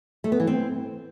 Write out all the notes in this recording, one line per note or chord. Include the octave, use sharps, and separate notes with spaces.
A3
B3
E3
C4